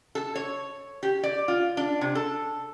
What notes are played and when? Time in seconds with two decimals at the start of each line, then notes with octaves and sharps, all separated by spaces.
0.15 A4
0.36 C#5
1.03 G4
1.23 D5
1.48 F4
1.77 D4
2.01 C3
2.15 A4